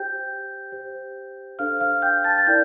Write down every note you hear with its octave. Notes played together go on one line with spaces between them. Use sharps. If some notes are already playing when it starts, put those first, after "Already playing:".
Already playing: G4 C5 G5 G6
G4 C5
D4 A4 C5 F5 F6
F5 F6
G5 G6
A5 A6
A6
E4 A#4 D5 G5 G6